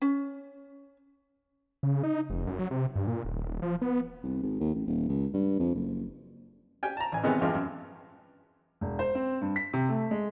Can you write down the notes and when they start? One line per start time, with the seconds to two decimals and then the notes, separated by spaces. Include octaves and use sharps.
0.02 C#4
1.83 C#3
2.03 D#4
2.30 F1
2.47 F#2
2.59 F#3
2.71 C3
2.96 G2
3.07 A#2
3.25 D#1
3.62 F3
3.82 B3
4.24 C2
4.43 G#1
4.60 D#2
4.75 A1
4.87 D#1
5.09 C#2
5.34 G2
5.59 F2
5.75 F#1
6.83 G4 G5 G#5
6.97 A5 A#5
7.12 A1 G#5
7.24 C3 D#3 E3 G#3 B3 C#4
7.41 E2 G2 F3 G#3 C4
7.55 F#2
8.81 E1
8.99 C5
9.15 C4
9.41 G2
9.56 B6
9.73 C3
9.89 A3
10.11 G#3